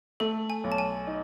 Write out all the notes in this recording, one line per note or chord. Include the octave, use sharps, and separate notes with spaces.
A3 A4
G#5
B1
A5
G#5
D#4